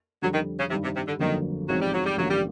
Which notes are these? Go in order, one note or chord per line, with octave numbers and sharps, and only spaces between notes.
F2 D3 F#3 G3
D#3
C#3
G2 C3 D#3 G3
C3
C3
D3
G1 F2 D3 D#3 F#3 A#3
A1 G#2 F3 F#3 G#3 C4
G3
F#3
G3
A1 G2 D3 F3 F#3 A#3
G3